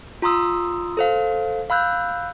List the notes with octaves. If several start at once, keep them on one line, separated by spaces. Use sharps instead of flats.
F4 A#5 C6 D#6 E6
A4 C5 F5
F5 B5 E6 F#6 G6